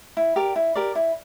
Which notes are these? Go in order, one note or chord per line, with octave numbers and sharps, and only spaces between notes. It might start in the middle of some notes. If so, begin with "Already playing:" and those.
E4
G4 A#4 D5
E4
G4 A#4 D5
E4